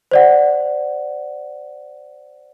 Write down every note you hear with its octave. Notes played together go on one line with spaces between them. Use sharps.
C5 D5 F#5